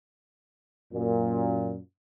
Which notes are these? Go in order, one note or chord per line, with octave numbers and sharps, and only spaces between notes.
F#2 A#2